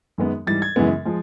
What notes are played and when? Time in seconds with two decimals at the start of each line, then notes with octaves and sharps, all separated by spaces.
0.18 F#2 D#3 G#3 B3
0.47 G#2 E3 G3 A6
0.62 G#6
0.76 F#2 C#3 E3 G#3 B3
1.05 F3 G#3